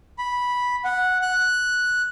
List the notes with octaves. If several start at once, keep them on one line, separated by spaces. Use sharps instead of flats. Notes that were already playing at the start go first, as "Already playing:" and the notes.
B5
F#5
F#6